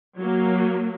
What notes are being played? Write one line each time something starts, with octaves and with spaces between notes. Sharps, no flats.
F#3 A#3